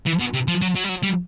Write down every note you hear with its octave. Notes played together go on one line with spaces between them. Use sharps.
E3
B2
C3
F3
F#3
F#3
G3
F#3
G3